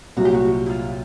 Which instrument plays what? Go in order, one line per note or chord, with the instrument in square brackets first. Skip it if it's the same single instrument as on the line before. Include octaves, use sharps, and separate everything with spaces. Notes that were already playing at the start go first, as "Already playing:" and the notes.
[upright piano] C2 A#2 F#3 [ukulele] F#4
[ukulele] G4
F#4
E4
F4